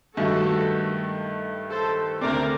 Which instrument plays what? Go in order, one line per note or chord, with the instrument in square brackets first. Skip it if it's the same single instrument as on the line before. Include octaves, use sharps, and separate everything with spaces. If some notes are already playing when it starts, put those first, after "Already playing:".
[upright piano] G2 D#3 A3 [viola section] F#4 A4
[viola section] A4 C5
[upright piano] D2 D3 A3 C4 [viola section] A#4 D5